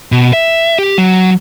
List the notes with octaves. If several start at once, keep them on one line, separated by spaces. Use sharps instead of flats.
B2
E5
G4
F#3